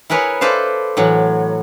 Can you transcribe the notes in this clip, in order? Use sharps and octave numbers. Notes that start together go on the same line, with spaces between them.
E4 G#4 A#4 B4 C#5
A4 B4 C5 D5 F5
A2 E3 F#3